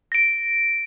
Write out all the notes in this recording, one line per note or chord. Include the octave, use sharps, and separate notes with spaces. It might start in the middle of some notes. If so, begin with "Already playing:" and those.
A#6 D7